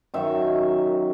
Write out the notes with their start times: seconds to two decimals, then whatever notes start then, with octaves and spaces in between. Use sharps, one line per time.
0.14 F#2 D#3 F#3 E5